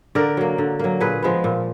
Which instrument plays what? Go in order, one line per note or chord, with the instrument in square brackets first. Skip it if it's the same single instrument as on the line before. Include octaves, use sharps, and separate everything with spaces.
[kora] D3 A#4 D5
F#3 A#3
D3
F#3 A#3
A#2 G#4 B4
F3 G#3 B3
A#2